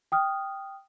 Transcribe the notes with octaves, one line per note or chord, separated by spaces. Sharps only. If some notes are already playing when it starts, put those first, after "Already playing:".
G5 D#6 F6